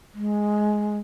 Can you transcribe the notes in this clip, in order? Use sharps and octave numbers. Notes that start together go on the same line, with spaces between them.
G#3